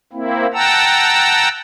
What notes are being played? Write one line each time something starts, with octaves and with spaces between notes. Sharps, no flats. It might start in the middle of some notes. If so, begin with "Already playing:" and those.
A#3 C4 E4
F#5 G5 A5 A#5 E6